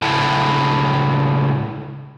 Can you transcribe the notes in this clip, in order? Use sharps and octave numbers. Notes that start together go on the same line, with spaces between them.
C#2 A2